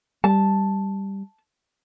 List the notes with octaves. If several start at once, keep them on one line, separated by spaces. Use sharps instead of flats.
G3 A5